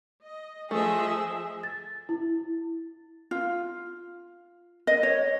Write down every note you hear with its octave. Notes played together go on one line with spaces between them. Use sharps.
D#5
F3 A3 G#4 D#5 E5
A6
E4
F4
D#5
C#5